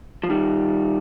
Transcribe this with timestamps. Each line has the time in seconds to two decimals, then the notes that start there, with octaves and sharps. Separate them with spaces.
0.23 F3
0.30 D#3 G3